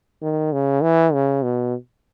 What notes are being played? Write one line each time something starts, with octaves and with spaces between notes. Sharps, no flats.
D#3
C#3
E3
C#3
B2